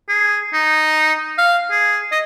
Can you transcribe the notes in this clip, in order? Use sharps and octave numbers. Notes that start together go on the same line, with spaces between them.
G#4
D#4
F5
G#4
D#5